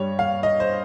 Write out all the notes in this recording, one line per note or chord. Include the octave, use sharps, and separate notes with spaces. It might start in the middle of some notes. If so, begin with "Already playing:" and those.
Already playing: G2 G3 C#5
F5
D#5
C5